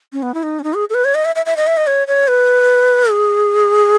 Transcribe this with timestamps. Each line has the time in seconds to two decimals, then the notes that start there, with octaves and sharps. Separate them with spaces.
0.13 C#4
0.22 B3
0.34 E4
0.43 D#4
0.59 C#4
0.64 D#4
0.74 G#4
0.90 A4
0.94 B4
1.05 C#5
1.15 D#5
1.25 E5
1.35 E5
1.46 E5
1.56 D#5
1.67 E5
1.77 D#5
1.87 C#5
2.07 C#5
2.28 B4
3.10 G#4